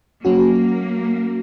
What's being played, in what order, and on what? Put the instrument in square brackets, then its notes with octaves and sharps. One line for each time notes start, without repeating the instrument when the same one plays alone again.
[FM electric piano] F#3 C#4 F#4 [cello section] A#3